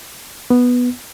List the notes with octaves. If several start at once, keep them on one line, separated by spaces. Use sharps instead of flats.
B3